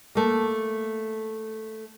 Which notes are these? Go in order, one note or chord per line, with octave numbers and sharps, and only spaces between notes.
A3 A#3